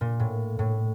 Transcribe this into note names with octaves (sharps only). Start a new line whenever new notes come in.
A#2
A2
A2